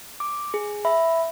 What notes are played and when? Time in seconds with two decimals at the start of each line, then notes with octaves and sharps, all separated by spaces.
0.20 D6
0.54 G#4
0.85 E5 B5